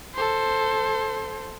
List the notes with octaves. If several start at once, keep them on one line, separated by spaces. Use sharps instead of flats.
A4 C5